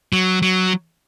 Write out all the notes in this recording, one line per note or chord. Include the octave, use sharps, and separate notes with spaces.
F#3
F#3